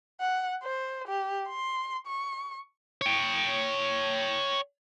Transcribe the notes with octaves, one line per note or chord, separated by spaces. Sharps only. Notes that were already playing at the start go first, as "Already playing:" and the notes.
F#5
C5
G4
C6
C#6
C#5 G5